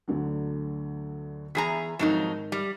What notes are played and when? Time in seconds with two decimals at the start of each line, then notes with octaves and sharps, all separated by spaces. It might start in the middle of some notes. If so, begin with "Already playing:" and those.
0.08 D2 D3 F#3
1.55 E2 G#4 A#5 B5 B6
1.99 F2 G#2 D#3 F#3 D#4
2.52 G3